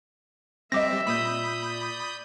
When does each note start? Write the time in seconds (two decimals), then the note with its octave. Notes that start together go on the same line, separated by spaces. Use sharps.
0.72 G3 C4 D#5 E5 D6 A#6
1.07 A#2 B5 D#6 G6
1.65 D5